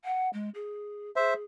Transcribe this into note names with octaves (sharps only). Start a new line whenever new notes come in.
F#5
G#3
G#4
G#4 C5 E5